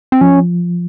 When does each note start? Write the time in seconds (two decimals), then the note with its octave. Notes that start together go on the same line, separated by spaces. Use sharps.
0.12 C4
0.21 F3 C#4